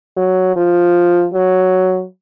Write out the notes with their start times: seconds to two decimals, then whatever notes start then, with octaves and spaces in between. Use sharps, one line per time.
0.17 F#3
0.56 F3
1.34 F#3